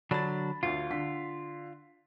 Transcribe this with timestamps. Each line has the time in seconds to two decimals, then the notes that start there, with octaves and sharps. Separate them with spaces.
0.11 D3 F#3 D4 B5 A6
0.63 D2 D3 F4
0.90 D3 B6